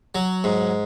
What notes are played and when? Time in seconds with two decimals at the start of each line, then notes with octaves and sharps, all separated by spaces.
0.15 F#3
0.44 G#2